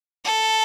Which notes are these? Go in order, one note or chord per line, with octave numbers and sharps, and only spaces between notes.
A4